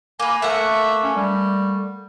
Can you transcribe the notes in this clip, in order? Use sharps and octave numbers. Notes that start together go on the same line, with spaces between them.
A#3 B4 G#5
A3 A#3 E5 F#5
C#4
G3